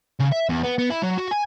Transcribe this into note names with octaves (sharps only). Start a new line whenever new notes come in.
C#3
E5
E2
B3
B3
E4
F#3
F#4
G#5